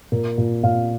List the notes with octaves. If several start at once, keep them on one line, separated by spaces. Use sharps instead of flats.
A#2 A#4
A#2
A#2 F5